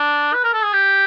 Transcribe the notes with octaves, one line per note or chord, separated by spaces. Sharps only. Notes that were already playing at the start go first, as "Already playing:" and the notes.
Already playing: D4
B4
A#4
A4
G#4
G4